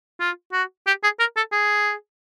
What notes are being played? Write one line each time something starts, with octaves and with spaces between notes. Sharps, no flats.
F4
F#4
G4
G#4
A#4
A4
G#4